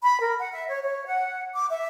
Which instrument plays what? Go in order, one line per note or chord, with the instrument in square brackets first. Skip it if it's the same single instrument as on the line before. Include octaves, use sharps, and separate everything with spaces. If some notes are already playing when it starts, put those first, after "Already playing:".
[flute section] B5
A#4
F#5
E5
C#5
C#5
F#5
D6
E5